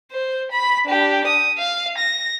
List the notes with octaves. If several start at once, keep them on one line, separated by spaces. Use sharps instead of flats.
C5
B5
D4 G4
D#6
F5
A#6